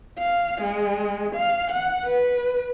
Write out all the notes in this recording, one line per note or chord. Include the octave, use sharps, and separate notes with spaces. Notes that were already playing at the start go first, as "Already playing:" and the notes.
F5
G#3
F5
F#5
B4